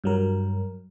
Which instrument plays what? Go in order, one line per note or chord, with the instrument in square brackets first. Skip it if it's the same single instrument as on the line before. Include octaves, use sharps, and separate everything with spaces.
[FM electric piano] G2 F#3 A#4